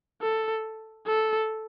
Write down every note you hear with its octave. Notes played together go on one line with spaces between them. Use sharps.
A4
A4